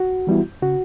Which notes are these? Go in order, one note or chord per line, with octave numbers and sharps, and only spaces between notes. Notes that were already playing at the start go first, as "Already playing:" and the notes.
Already playing: F#4
E3 G3 B3 E4
C#3 F#4